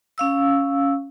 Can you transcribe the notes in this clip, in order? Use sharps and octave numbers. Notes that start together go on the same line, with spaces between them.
C#4 F5 E6